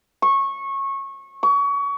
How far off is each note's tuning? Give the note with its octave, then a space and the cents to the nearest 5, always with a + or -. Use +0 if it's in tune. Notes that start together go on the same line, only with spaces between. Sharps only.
C#6 -20
C#6 +30